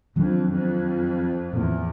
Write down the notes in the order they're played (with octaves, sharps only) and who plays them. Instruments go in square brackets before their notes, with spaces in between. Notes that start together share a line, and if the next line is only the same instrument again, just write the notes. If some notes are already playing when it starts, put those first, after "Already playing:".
[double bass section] F2 [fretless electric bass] D#3 F#3 B3 D4
[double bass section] F2
[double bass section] E2 [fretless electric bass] A2 F3 A#3